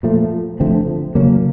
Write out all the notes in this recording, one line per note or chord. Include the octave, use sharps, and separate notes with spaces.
A#2 F3 A3
D3 F3 A3 C4
C#3 F#3 A#3 C#4